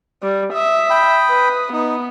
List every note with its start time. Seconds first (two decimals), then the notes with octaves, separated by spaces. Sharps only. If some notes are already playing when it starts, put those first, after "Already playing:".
0.23 G3
0.53 E5 D#6
0.90 G5 B5
1.30 B4
1.73 B3 D#4